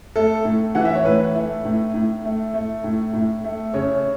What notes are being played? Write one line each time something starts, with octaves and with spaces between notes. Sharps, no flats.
A3 A4
A2
E3 F#5
E5
C#5
A2 B4
A3
A2
A2
A3
A3
A2
A2
A3
C#3 C#5